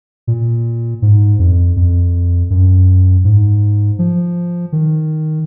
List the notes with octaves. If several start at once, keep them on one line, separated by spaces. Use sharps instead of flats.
A#2
G#2
F2
F2
F#2
G#2
F3
D#3